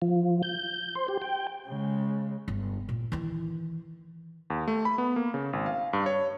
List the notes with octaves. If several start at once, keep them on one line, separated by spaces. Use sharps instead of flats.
F3
G6
C5
G4
G5
C#3 G#3
G1
A#2
D#3 E3
D#2
A3
B5
B3
A#3
C#3
G#1
F5
G2
C#5